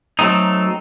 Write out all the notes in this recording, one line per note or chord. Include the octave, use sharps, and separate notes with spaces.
F#3 A3 C4 D#4